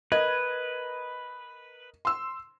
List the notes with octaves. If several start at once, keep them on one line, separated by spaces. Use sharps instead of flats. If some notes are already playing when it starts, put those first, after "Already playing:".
A#4 B4 D#5 G#6
C6 E6